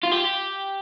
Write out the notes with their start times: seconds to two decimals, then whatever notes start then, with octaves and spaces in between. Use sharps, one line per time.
0.03 F4
0.11 G4